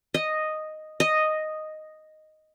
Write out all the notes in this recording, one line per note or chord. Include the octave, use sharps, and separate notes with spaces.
D#5
D#5